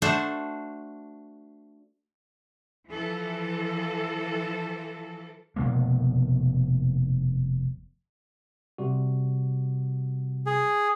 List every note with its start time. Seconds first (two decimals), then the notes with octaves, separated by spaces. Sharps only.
0.02 A3 D4 F#4 A4 C5
2.89 E3 F3 A4
5.56 F1 B2 G#3 A#3
8.78 C3 G3 F#4
10.46 G#4